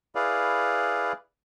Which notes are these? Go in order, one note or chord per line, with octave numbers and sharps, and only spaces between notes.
E4 G#4 B4 D5 F5